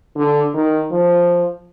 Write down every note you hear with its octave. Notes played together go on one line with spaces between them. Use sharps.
D3
D#3
F3